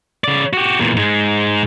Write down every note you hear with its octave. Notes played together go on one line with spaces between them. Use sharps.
C#3 D5
F#4 G4
E2 A#2
G#2 G#3